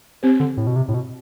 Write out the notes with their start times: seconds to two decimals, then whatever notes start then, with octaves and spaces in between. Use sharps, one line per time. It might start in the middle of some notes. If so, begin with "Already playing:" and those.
0.23 C4 G4 C5
0.40 D3
0.57 A2
0.67 B2
0.76 C3
0.88 A2
0.94 B2